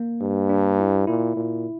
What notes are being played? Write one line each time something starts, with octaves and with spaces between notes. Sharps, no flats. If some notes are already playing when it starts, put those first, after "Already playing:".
Already playing: A#3
G2
D4
E4
A#2 E4
A#2